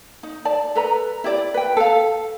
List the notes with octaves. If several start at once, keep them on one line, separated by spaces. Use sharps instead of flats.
D#4
D5 A5
A4 B4 A#5
E4 G4 D5
B4 G5
A4 F5